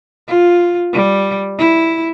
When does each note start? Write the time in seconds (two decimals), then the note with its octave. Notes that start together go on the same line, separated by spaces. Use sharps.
0.28 F4
0.93 G3
1.58 E4